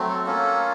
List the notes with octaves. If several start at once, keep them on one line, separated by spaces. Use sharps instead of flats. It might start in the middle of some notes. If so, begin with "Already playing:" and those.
Already playing: F#3 A3 C4
A4
A#3 C#4 F4 A4